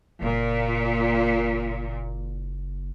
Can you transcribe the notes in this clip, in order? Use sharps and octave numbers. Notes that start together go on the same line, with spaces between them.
F#1 A#2